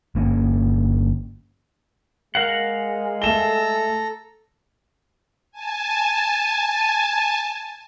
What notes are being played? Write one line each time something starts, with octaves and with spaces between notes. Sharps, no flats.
G1 A#3 C4 C#4
G#3 A#4 F5 F#5
A3 A4 A#5 E7 G7
G#5 A5